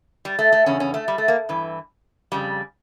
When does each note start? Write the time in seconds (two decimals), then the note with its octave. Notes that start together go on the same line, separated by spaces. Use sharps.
0.25 G3
0.39 A3
0.52 A3
0.66 E2 C#3 C#4
0.80 C#4
0.94 A3
1.08 G3
1.18 A3
1.28 A#3
1.49 G2 E3
2.32 F2 C#3 G3